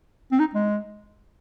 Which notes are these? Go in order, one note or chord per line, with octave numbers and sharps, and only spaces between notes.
C4
D#4
G#3